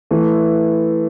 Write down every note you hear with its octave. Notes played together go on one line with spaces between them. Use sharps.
E3 A3